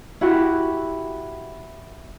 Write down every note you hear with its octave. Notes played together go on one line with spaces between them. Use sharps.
E4 F#4 G4